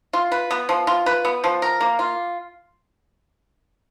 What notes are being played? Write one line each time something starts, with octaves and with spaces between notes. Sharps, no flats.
F4
B4
B3
F3
F4
B4
B3
F3
A#4
A#3
F4